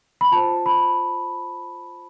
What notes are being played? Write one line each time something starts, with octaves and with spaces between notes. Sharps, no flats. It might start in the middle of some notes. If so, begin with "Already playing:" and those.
B5
F4 C5 A5
B5